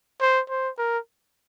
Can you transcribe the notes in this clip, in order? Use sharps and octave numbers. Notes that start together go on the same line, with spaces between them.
C5
C5
A#4